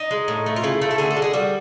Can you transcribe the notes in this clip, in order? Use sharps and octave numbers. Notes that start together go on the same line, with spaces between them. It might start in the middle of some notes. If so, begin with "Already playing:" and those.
Already playing: D#4
G#3
A2
A3
F4
C#3 E4
A3
A4
D3 G#4
A4
G#3
G#4
G3 F#4